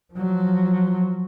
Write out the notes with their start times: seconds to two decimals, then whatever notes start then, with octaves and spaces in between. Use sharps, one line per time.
0.13 F3 F#3